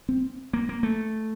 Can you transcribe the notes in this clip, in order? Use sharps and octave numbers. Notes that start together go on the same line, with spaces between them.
C4
A#3
A#3
A3